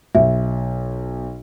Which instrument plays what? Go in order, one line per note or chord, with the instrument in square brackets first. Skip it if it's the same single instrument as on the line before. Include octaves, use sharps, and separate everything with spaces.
[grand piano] B1 [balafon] E5